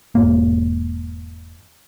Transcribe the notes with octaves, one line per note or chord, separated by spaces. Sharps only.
E1 G#2 A#3